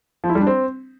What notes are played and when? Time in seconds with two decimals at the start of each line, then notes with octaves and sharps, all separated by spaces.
0.24 F3
0.29 E4
0.35 G3
0.41 D4
0.47 C4